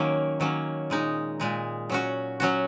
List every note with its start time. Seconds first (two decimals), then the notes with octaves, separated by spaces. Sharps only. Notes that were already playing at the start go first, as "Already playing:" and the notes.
Already playing: D#3 F#3 A#3 C#4
0.40 D#3 F#3 A#3 C#4
0.90 A#2 G#3 D#4
1.40 A#2 G#3 D#4
1.90 F#3 C#4 F#4
2.40 F#3 C#4 F#4